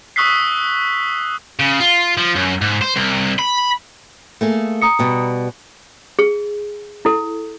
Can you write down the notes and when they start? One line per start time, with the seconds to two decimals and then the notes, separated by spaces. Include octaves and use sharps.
0.16 C#6 D#6 E6 F#6 B6 C7
1.60 C#3
1.80 F4
2.18 F3
2.35 F#2
2.61 G#2
2.82 C5
2.96 C2
3.39 B5
4.41 A3 A#3 G#4
4.82 A#5 D#6 C#7
4.99 B2 G3
6.19 G#4
7.05 E4 A4